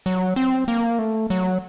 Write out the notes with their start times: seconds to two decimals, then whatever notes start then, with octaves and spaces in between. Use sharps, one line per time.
0.06 F#3
0.36 C4
0.68 A#3
0.99 A3
1.30 F#3